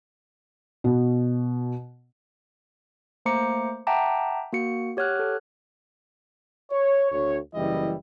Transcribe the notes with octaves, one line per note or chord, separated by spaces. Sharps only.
B2
A3 A#3 C5 A#5 D6 C#7
E5 F#5 G5 A5 A#5 D6
A#3 F#4 C#7
G4 C#5 F#5 F6 F#6
A4
C#5
D2 C#5
F#1 E3 G3 E4 D#5